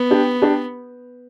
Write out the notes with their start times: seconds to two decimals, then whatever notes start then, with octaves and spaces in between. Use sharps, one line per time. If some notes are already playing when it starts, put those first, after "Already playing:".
Already playing: B3
0.11 D4 G4
0.42 D4 G4